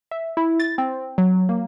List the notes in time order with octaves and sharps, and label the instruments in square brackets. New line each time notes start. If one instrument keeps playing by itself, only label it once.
[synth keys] E5
E4
A6
C4
F#3
A#3